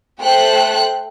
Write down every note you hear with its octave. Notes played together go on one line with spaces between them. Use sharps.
A3 C5 G5 F#6